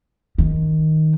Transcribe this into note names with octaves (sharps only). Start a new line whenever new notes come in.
D#3